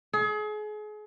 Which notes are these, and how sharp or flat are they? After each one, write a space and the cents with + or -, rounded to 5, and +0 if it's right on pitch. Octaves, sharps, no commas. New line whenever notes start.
G#4 +35